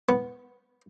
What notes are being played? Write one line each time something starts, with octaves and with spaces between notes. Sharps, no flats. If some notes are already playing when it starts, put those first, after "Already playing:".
B3